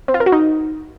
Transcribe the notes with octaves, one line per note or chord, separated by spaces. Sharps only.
C4
F4
A#4
F#4
D#4